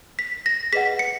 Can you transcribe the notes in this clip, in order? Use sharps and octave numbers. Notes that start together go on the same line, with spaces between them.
B6
A#6
G#4 B4 D#5 F#5 B6
C#7